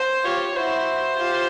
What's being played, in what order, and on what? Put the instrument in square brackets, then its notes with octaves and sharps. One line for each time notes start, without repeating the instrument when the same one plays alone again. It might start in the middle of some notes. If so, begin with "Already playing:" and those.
Already playing: [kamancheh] C5
[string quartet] F4 G4 [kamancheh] C#5
[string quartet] E4 F#4 [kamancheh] C5
[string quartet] F4 G4